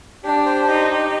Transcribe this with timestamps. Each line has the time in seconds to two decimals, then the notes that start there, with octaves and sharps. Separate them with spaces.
0.23 D4 G4
0.46 C5
0.68 D#4 G4
0.91 G4